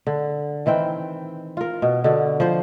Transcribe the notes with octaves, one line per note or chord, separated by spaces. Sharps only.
D3
D#3 E3 C4 G5
F4 A#4
B2
B2 D3
F3 C5